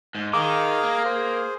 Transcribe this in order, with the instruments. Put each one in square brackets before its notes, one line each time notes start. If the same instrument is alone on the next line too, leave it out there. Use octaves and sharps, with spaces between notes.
[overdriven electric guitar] G#2
[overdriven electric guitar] D#3 [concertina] G#4 F5 A#5 [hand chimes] D6
[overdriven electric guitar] A#3
[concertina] G#4 C5